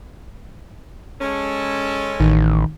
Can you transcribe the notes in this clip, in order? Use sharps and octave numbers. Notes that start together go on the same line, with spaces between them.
G#3 C#4 A4
A1 D#3